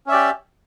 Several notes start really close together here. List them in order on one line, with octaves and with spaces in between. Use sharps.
C#4 E5 D5 G4